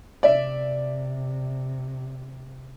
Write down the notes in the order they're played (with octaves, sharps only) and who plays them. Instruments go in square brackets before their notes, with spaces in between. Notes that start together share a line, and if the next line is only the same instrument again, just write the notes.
[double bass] C3 [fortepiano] D5 E5